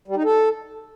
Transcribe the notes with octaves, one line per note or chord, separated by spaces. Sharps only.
G3
D#4
A4